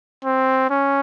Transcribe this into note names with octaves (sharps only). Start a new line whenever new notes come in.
C4
C#4